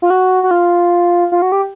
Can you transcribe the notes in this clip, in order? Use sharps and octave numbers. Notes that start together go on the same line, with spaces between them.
F4
F#4
F#4
F4
F4
F#4
G4